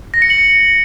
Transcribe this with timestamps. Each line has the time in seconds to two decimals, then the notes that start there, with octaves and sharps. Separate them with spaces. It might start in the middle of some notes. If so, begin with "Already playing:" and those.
0.14 A#6
0.22 C#7
0.30 F#7